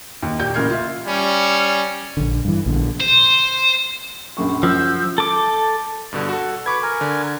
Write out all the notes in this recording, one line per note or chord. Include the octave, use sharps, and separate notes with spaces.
D#2
A#2 G4 G6
A1 C#3 A#4 F6 G#6 C7
F4 E5
G3 C#4
A#1 D3
G2 E3
A#1 B2 D3
C5
A#1 F#2 C#6
F#2 F3 E6 G6
A4 D6
G2 B2 D3
F#4 A4
B4 C#6 D6 G#6
A#4 G#5
D3